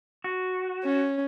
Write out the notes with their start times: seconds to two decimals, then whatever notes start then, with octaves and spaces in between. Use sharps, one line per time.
0.24 F#4
0.84 C#4